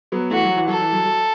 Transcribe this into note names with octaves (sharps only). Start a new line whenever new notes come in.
F#3 B3
E3 A3 F#4
F#3
E3
F#3 A4
E3
F#3
F#3